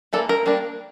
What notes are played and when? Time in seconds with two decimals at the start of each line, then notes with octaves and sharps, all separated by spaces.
0.13 E3 A#3 D4 A4
0.29 A#4
0.46 G3 A#3 D4